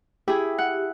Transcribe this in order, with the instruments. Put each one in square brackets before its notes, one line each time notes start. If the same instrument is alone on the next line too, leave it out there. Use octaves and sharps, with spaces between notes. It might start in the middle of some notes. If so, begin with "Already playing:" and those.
[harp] E4 G#4 [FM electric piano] G4
[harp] F#5